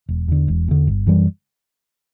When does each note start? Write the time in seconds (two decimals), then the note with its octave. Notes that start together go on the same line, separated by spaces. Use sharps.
0.09 E1
0.28 E2 D3
0.48 E1
0.68 E2 D3
0.87 G1
1.06 F#2 E3 G3